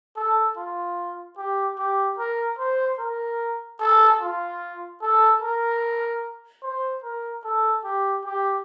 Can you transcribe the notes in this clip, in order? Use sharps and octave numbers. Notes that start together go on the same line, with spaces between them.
A4
F4
G4
G4
A#4
C5
A#4
A4
F4
A4
A#4
C5
A#4
A4
G4
G4